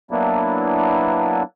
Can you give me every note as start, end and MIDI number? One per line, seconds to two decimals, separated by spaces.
0.11 1.43 54
0.11 1.43 58
0.11 1.43 59
0.11 1.43 62
0.11 1.43 64